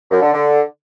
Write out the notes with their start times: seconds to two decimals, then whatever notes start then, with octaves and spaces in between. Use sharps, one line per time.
0.11 F#2
0.22 D3
0.33 D3